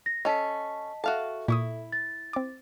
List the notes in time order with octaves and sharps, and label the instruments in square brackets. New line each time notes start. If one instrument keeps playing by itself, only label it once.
[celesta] A#6
[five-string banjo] C#4 A4 [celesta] D#5 A5 B6
[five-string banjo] F#4 F5 A5 [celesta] A4 E5
[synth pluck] A#2 C#6 D#6 [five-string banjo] E4
[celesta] A6
[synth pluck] C4 D6